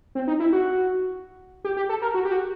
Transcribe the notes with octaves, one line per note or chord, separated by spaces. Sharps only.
C4
D#4
E4
F#4
G4
G4
A4
A#4
F#4
G4
F#4